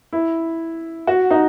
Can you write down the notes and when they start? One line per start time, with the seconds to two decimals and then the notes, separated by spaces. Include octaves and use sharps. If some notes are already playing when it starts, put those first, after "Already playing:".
0.13 E4
1.07 F#4
1.31 D#4